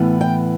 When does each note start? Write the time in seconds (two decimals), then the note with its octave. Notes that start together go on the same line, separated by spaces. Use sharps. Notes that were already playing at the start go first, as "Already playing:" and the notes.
Already playing: A2 E3 B3
0.21 G5